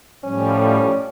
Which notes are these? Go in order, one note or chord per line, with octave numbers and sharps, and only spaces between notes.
A2 F3 G3 C#4